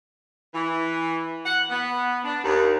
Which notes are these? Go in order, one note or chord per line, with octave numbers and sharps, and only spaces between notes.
E3
F#5
B3
D4
D#2